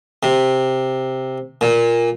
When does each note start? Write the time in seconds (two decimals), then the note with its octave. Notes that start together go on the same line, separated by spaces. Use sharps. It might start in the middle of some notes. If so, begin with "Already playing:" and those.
0.23 C3
1.61 A#2